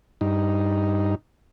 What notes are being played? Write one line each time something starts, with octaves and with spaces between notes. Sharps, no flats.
G2 D#4